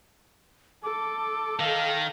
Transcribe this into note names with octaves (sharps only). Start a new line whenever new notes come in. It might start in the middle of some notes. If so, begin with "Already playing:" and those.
A4 D6
D#3 F5